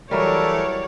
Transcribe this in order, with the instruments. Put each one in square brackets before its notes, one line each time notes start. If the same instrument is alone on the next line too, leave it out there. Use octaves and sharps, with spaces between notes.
[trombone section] E3 A3 [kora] F#3 G3 [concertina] A#4 [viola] C#5 D5